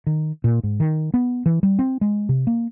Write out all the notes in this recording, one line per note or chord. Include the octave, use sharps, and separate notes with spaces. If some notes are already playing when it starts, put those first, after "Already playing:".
D#3
A#2
G#2
D#3
B3
E3
G3
C4
G#3
C3
A#3